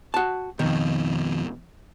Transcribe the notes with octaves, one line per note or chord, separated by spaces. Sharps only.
F#4 A5
F2 B2 D#3